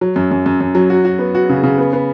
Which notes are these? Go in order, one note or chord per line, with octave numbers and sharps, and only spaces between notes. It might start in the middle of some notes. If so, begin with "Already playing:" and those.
F#3
F#2
F#2
F#2
F#2
F#3
F#4
F#4
B3
F#4
C#3
C#3
B3
B3